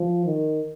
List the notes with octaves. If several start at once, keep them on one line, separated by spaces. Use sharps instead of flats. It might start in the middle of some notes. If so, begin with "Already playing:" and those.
Already playing: F3
D#3